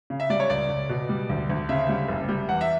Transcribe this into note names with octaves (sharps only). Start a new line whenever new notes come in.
C#3
E5
G3 D5
C#5
C#2 D5
C#2
B2
G3
D2
D2
C#3 E5
G3
F#1
G3
E2 F#5
E5